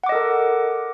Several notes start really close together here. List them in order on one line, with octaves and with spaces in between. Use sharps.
F#5 D6 D#5 A4 A#4